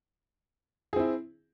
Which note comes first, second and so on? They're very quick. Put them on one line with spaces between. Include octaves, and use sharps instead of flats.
G#4 C4 E4